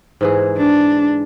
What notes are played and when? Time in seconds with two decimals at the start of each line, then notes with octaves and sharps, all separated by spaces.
0.21 G#2 E3 G#4
0.57 D4